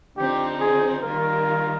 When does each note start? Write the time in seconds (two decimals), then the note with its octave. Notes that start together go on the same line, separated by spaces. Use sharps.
0.17 D3 F3 C4 D#4 G4
0.61 G#4
1.03 D#3 G3 A#3 F4 A#4